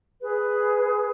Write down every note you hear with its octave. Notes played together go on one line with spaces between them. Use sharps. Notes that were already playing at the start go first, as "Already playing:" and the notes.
G#4 B4